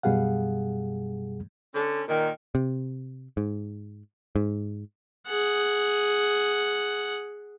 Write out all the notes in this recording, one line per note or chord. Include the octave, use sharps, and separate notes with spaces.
F#2 B2 G3 G#4 F5 F#5
D3 C#4 A4
A#2 D#3
C3
G#2
G#2
G#4 F#5